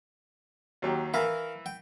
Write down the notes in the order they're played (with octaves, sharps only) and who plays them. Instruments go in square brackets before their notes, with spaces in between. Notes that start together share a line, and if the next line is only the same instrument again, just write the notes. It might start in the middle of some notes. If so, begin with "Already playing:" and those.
[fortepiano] D#2 F#3 G4
[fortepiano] E3 E4 [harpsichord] A#4 F5
[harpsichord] G5